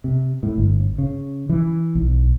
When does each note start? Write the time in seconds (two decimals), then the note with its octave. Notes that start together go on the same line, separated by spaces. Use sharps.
0.04 C3
0.43 A2
0.58 G1
0.98 C#3
1.49 E3
1.95 B1